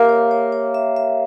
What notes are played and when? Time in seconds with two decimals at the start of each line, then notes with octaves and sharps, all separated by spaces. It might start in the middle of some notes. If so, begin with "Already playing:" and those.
Already playing: A#3 G4 E5
0.09 C#5
0.31 C#5
0.52 C#5
0.74 E5
0.96 E5